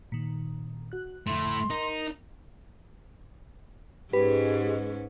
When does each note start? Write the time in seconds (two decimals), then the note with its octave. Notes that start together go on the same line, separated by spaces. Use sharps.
0.12 A#2 D#3
0.92 F#4 F#6
1.27 F2 D3 A3 E4 C6
1.70 D#4 A#4
4.13 G#2 G#3 C#4 G4 B4